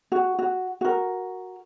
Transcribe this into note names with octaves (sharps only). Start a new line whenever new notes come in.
F#4
F#4
F#4 A#4